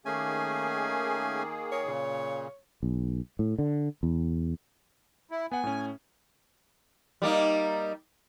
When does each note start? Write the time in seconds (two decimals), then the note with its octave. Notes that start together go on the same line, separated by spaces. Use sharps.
0.06 D#3 A3 A#3 C#4 G#4 G#5
1.72 A#4 C#5
1.86 A#2 C#3
2.83 B1
3.39 A2
3.59 D3
4.03 E2
5.31 E4
5.52 B3 F#5 G#5
5.64 A2 C#4
7.22 G3 A#3 D#4